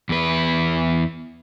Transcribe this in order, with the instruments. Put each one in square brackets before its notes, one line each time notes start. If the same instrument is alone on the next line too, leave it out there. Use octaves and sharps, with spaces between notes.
[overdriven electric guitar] E2 B4